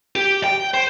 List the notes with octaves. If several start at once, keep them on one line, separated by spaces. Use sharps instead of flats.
G4
G5
C5